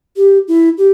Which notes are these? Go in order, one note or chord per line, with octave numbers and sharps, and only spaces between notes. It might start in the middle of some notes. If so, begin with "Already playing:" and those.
G4
E4
G4